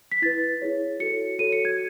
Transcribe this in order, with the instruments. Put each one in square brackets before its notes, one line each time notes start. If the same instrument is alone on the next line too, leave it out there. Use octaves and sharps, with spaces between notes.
[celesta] B6
E4 B4 A6
E4 G#4 C#5
F#4 A4 C#5 C#7
F#4 A4 C#5 D#7
C#7
G#6